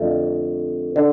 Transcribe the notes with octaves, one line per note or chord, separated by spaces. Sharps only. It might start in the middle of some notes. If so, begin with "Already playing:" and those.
Already playing: F2 D3 A3
D3